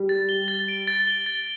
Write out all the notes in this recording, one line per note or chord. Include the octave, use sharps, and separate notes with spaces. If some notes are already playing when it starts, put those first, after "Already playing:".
Already playing: G3
A6
G7
A6
D7
A6
G7
A6